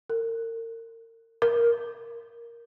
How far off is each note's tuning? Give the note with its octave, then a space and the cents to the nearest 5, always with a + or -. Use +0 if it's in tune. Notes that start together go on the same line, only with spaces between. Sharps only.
A#4 -35
A#4 +5